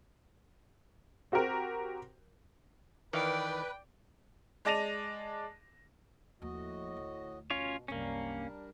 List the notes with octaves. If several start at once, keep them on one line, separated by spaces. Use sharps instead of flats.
C4 F#4 G4 A#4
D#3 E3 B4 D5 F5 G5
G#3 D5 A5 A#6 D#7 F7
D#2 A2 F3 F#4 D#5
D2
B2 C#4 F4 C#5
C2 F#2 G3 A#3 C#4 D4 A#4